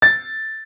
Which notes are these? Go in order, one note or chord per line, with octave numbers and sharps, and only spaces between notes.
A6